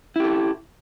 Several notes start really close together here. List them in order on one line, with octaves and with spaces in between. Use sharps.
E4 G4 A4